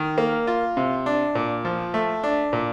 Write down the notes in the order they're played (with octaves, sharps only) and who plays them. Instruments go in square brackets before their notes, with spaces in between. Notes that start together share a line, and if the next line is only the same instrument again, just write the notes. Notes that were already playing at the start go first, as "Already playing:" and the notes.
Already playing: [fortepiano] D#3
A#3
F4
C3
D4
A#2
F3
A3
D4
A#2